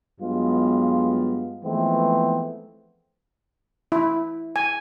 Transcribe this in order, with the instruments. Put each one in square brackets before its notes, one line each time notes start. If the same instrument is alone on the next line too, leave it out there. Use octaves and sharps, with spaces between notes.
[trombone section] G2 F#3 G#3 B3 F4
E3 F3 G#3 A3 B3 C4
[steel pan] E4
G#5